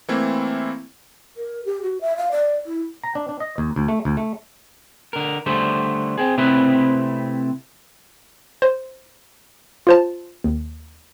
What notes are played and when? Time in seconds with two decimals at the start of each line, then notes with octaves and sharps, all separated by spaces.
0.08 E3 A3 A#3 C4 E4
1.37 A#4
1.65 G4
1.83 F#4
2.01 E5
2.17 F5
2.32 D5
2.66 E4
3.04 A#5
3.15 D4
3.29 D4
3.40 D#5
3.58 D#2
3.76 D2
3.88 A3
4.05 D2
4.17 A3
5.13 D3 A#4
5.46 D3 G3 A3 C5
6.18 C4 G#4
6.38 C3 A3 C4 E4 B4
8.62 C5
9.87 F4 C5 A5
10.44 D#2